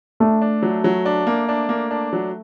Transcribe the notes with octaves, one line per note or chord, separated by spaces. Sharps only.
A3 D4
D4
F#3
F#3
D4
A#3
D4
A#3
D4
F#3